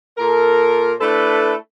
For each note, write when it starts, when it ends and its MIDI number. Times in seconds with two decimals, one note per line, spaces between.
0.18 0.92 46
0.18 0.92 69
0.18 0.92 70
1.00 1.54 57
1.00 1.54 62
1.00 1.54 64
1.00 1.54 69
1.00 1.54 71